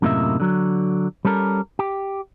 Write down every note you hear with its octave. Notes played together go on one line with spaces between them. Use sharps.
F#2 A2 C3 A#3 D#4 E5
D3 F#3
G3 C#4 A4 A#4
G4